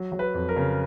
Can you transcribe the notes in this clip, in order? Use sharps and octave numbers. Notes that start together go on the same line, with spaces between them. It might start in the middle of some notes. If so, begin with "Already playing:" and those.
Already playing: F#3
F#3
B4
F2
A#4
C#3